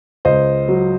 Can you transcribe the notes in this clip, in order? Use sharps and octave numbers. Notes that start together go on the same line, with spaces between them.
C#2 C5 D#5
F#3